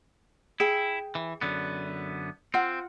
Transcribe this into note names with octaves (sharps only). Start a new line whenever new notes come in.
E4 G#4 G5
E3
F#2 D3 B3
C4 F4 F#5